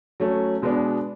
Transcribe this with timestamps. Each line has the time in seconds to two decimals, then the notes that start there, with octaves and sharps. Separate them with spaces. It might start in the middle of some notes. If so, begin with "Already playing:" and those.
0.20 F#3 A3 C#4
0.62 B2 G#3 B3 D4